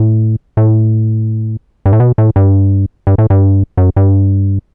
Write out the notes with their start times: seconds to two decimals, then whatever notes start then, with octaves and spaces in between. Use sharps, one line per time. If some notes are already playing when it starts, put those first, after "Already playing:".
Already playing: A2
0.57 A2
1.86 G2
1.93 A2
2.00 B2
2.18 A2
2.36 G2
3.07 G2
3.18 A2
3.30 G2
3.77 F#2
3.96 G2